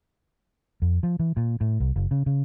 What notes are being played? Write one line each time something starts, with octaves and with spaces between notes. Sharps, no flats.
F2
F3
E3
A#2
A2
C2
F#1
C#3
C#3